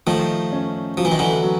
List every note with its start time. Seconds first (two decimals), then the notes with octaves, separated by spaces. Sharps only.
0.07 D#3 F3 A3
0.53 C#4
0.97 F3 F#3
1.05 E3
1.12 D#3
1.19 D3 E3
1.43 F#3